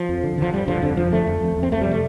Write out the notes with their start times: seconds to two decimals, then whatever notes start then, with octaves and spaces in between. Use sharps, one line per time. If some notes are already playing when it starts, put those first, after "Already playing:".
Already playing: F3
0.09 F2
0.23 D3
0.38 D3 F3
0.53 G2 G3
0.68 D3 F3
0.82 F2 D3
0.97 F2 F3
1.12 D3 A3
1.27 F2
1.42 F2
1.57 F2
1.63 C4
1.72 F2 A3
1.81 G3
1.87 C3 A3